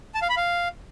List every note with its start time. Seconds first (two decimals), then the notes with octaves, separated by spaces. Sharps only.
0.14 A5
0.22 F5
0.29 B5
0.37 F5